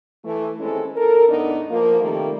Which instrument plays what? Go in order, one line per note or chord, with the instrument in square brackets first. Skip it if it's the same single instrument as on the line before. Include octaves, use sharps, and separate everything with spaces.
[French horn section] E3 A3
D#2 G#3 C4 C#4 E4 A4
A4 A#4
E2 A2 B3 D4 D#4
F3 A#3
C3 D#3 G3 A3 A#3 D#4